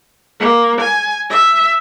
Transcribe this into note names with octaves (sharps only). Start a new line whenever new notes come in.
A#3
G#5
E5